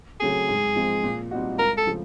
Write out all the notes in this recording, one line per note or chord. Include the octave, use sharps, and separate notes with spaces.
C#3 F#3 A3 C4 G#4
G#2
F3 G#3 C4
A#2
G3 C4 D#4 F#4
C#2 A#4
A4
C#3 F3 A3